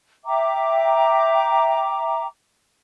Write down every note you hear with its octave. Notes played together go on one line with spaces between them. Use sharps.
E5 G5 A#5 D6